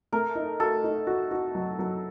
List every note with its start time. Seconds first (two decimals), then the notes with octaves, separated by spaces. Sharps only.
0.12 A3 A#4
0.35 D#4
0.60 F#4 A4
0.84 D#4
1.07 F#4
1.31 F#4
1.55 F#3
1.79 F#3